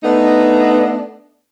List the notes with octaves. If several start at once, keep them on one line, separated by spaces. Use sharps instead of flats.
A3 B3 D4 D#4